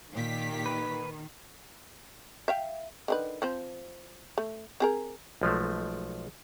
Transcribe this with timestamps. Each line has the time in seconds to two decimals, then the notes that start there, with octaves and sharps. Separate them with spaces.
0.12 A#2 D#3 G4 B6
0.66 B4
2.48 E5 F5 G5
3.08 D3 D#3 B4
3.42 F3 C4 C5
4.38 A3
4.80 C4 G#4 A#4
5.41 B1 F3 G#3 A3